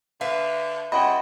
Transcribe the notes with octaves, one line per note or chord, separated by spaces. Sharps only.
D3 B4 E5 F5
C#2 D#5 F#5 G5 B5